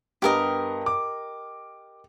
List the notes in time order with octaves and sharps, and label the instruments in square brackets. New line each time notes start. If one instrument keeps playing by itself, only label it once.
[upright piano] G2 B3 [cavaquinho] G4 A#4 D#5
[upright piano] D6